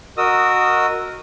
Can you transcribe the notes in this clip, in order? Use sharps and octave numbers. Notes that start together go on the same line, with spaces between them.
F#4 A#4 D#5 D#6 E6